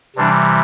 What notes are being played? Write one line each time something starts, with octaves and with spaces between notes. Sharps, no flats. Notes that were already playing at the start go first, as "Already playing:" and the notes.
C3 E3 G3 D4